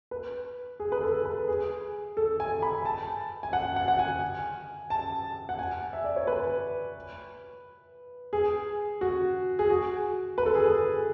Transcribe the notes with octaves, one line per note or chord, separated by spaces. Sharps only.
B4
G#4
B4
A4
B4
G#4
A4
G#5
B5
A5
G#5
F#5
F#5
F#5
G#5
A5
F#5
G#5
E5
D5
C#5
B4
G#4
F#4
G#4
F#4
B4
A4
G#4
A4